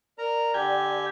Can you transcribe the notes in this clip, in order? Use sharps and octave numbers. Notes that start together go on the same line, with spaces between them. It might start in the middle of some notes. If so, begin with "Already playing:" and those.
A#4 D5 A#5
D3 G4 G5 G#5